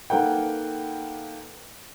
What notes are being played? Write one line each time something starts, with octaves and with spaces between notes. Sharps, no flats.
A#3 D#4 A4 B4 F#5 G5